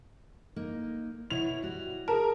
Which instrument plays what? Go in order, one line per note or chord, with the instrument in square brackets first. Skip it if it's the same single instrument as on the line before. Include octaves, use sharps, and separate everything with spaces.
[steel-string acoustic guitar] A#3 D#4
[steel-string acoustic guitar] B2 E4 C#5 [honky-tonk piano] F7
[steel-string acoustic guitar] G3 F#4
[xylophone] G#4 A5 [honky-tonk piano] A#4